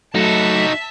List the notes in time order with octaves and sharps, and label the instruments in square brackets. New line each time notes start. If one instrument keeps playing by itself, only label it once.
[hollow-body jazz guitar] F#3 A3 [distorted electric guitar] D#4 F#4 [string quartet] E5 A5